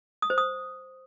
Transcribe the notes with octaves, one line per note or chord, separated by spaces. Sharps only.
D#6
C5
D#6